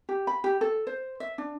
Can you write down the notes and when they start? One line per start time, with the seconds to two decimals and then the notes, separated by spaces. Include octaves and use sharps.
0.09 G4
0.27 B5
0.44 G4
0.61 A4
0.87 C5
1.20 E5
1.38 D4